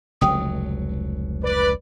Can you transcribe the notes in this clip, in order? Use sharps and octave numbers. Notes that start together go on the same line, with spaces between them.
F1 C#2 F#3 G5 D#6
B4 D5